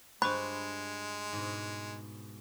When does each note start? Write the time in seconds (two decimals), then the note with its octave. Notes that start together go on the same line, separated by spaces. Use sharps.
0.22 G2 G#3 F4 G4 C5 B5 C#6 F#6
1.33 G#2 B2